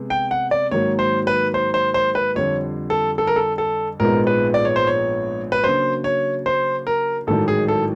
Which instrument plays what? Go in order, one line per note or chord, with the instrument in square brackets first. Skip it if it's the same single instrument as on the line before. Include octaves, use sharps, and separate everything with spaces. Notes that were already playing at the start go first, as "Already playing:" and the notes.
Already playing: [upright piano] C3 G#3 B3
[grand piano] G5
F#5
D5
[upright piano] G#2 D#3 F#3 A#3 [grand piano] C#5
[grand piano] C5
B4
C5
C5
C5
B4
[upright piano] F2 D3 G3 [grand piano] C#5
[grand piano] A4
A4
A#4
A4
A4
[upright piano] A#1 G#2 F3 G#3 B3 [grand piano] A#4
[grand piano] B4
D5
C#5
C5
C#5
B4
[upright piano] C#3 F#3 A#3 D4 F#4 [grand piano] C5
[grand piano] C#5
C5
A#4
[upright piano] A1 G#2 D#3 F#3 [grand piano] A4
[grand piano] G#4
A4